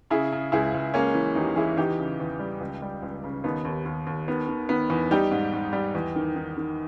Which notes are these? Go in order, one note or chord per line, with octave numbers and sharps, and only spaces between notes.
C#3 E4 G#4
C#3
C#2 E4 G#4
C#2
G#3 A#3 C#4
E3
E2 D#4 G4
E3 E4 G#4
E2 D#4 G4
C#3
E2
G3
C#2
G3
C#2
C#3
D#2 B3 D#4
D#2
D#2
D#2
D#3 B3
D#3
D#3 B3
E2
G3 D#4 G4
G#2
G#2
G3
E2
D#3
D#3
D#3